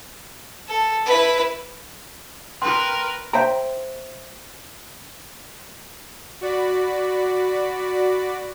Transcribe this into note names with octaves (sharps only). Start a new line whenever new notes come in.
A4
E4 B4
A#4 B4 G5 C6
C5 E5 G5 A#5
F#4 D5 B5